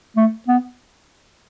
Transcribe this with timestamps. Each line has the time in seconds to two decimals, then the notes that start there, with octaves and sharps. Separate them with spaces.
0.16 A3
0.48 B3